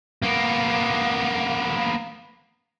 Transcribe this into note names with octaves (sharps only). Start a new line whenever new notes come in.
A#3 B3